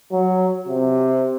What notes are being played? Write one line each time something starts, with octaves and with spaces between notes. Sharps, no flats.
F#3
C3